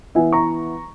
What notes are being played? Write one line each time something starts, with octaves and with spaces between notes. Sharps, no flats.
E3 B3 E4 E5 G#5
A#5 C#6